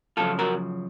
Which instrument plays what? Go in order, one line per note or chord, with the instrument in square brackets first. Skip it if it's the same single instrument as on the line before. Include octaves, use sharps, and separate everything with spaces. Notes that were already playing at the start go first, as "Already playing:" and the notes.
[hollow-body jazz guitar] F#2 C#3 F3 F4 A4
F#4 A#4